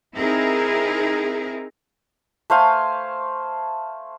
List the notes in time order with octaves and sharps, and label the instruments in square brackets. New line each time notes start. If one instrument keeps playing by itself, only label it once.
[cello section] C4 D#4 E4 G#4 A#4
[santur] A3 C5 F5 G#5